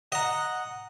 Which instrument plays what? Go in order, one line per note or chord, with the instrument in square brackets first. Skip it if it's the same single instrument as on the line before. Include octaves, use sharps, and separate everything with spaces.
[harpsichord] D#5 A#5 [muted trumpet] F#5